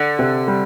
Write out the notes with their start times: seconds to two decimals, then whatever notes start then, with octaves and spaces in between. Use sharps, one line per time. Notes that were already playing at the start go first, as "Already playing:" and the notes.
Already playing: D3
0.19 C3
0.48 G3